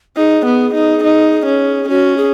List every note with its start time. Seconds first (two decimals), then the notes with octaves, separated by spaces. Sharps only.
0.17 D#4 G#4
0.45 B3
0.74 D#4
1.03 D#4
1.46 C#4
1.89 C#4 F#4
2.17 G#4